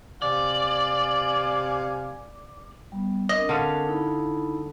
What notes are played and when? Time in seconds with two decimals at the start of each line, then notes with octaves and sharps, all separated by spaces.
0.22 C3 D5 F5 G#5
2.92 G3 B3
3.29 C4 D4 A#4 D#5
3.49 D3 C#4 F5
3.87 D#4 E4 B5